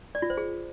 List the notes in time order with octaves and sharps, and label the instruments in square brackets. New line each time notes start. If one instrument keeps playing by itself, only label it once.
[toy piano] D5
F4
C5
G#4